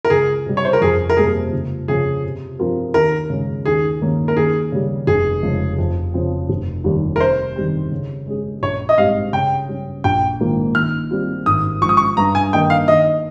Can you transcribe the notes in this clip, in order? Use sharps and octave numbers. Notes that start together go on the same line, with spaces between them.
A#4
C#2 G#4
C3 G3
C#5
C5
A#4
F2 G#4
A#4
C3 G3 A#3 C#4 G#4
C#2
C#3 F3 G#4
C3
F3 C4 F4 A#4
D#2 A#4
C#3 G#3 C#4
D#2 G#4
D#3 A#3 C#4
A#4
D#2 G#4
C#3 G3
F1 G#4
F2 C#3 G#3
F2
C#3 F3 C4
F1
D#2 D#3 G3 C#4
A#4
C3 C5
D#3 G3 C4
C#3
G#3 C#4 G#4
A#1 C#5
D#5
G#2 G3 C4 G4 F5
C#3 G5
G3 C#4
A#1 G5
G#2 D#3 A#3 F4
D#3 F6
G3 C4 F4
G#1 D#6
G#2 F3 C#6
D#6
C#6
G2 A#5
G#5
D#3 A#3 D#4 A#4 G5
F5
D#3 D#5